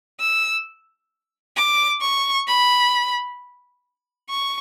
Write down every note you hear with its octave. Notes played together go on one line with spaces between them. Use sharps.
E6
D6
C#6
B5
C#6